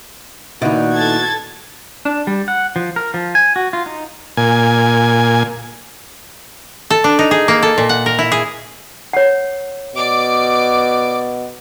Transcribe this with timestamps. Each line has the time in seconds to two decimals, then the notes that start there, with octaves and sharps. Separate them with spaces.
0.62 A#2 D#3 B3 D#4 E4 F#4 D5
0.96 A4 G#6 A6
2.05 D4
2.27 G3
2.48 F#5
2.76 F3
2.96 A#4
3.14 F3
3.35 G#5
3.56 F#4
3.73 F4
3.86 D#4
4.37 A#2 G#5
6.90 A4
7.04 D4
7.19 D#4
7.31 G#4
7.48 A#3
7.63 A4
7.78 A#2
7.89 F#5
8.06 A#4
8.19 E4
8.32 G#4
9.13 C#5 F#5
9.96 B2 D5 D6